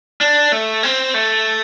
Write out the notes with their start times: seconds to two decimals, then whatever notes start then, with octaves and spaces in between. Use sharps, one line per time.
0.21 D4
0.52 A3
0.83 C4
1.14 A3